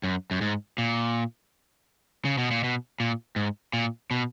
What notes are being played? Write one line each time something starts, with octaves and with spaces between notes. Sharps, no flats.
F#2
F#2
G#2
A#2
C#3
B2
A#2
B2
A#2
G#2
A#2
B2